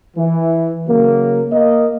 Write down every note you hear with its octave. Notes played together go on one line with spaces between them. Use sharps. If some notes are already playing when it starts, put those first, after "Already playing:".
E3
C#3 F#3 A#3
A#3 D#5